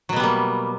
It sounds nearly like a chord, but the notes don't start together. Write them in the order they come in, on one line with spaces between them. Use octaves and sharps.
F#3 B2 B3 G3 A#3